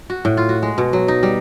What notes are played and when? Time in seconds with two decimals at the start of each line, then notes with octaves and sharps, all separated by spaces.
0.10 F#4
0.25 A2
0.37 F4
0.49 F#4
0.63 G#3
0.78 B2
0.93 F#3
1.08 D#4
1.23 G3